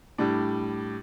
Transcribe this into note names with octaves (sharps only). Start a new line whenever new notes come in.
A2 G3 D4